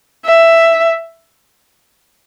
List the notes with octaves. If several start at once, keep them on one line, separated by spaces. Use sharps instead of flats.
E5